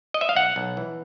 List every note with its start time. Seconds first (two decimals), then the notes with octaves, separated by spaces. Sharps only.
0.14 D#5
0.21 E5
0.29 F5
0.35 B1 F#5
0.56 B1
0.77 E3